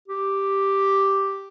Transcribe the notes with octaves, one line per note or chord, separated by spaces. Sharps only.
G4